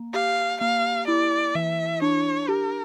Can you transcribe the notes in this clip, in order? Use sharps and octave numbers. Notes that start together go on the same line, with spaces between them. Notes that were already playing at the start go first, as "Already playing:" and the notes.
Already playing: A#3
G4 F5
A#3 F5
E4 D5
E3 E5
D4 C#5
G4 A#4